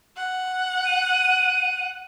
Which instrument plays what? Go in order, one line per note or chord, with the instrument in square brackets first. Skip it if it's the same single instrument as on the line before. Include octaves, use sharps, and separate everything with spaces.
[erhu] F#5
[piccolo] D#7